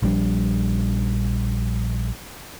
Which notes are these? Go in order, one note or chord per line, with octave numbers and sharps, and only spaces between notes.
A#1 F3 G3 D4